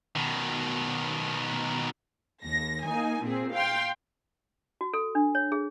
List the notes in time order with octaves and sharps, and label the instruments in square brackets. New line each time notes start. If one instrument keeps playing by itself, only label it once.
[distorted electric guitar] B2 D#3
[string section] D#2 A#6
A#3 D#4 G#5
A#2 C4 G#4
F5 G5 C6
[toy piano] F#4
A4
D4
C#5
G#4